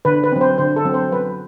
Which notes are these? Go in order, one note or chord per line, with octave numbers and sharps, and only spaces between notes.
D3 B4
B4
F#3 C4
C5
D3 C5
A4
F#3 C4
C5
F#3 B4